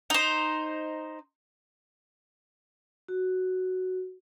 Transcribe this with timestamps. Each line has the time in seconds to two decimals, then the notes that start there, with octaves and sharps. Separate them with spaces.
0.10 D#4 C5
3.08 F#4